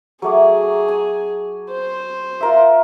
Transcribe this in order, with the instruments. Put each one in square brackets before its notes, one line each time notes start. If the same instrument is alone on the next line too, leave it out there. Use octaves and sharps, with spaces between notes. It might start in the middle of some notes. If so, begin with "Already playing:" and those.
[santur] F#3 A3 D6 [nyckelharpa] G#4
[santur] G#5
[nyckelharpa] C5
[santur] F4 A#4 E5